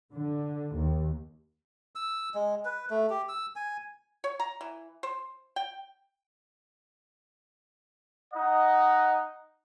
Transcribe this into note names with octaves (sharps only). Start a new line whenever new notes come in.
D3
D#2
E6
G#3
B4
A3
G4
E6
G#5
C#5
A#5
E3
C5
G5
D#4 D#5 F#5